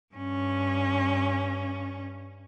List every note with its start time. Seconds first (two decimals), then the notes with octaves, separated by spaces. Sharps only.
0.15 G2 C#4